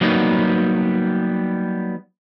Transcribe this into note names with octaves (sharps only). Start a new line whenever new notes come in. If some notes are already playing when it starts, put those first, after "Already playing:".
F#3 G3 A#3 B3 D#4